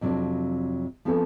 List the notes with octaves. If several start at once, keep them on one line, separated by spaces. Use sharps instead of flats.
F2 C3 F#3 D4 F4 D5
F3 B3 C4 D4 G#4 A4